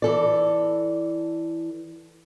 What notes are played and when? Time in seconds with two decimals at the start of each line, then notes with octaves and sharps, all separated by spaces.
0.02 E3 A4 D5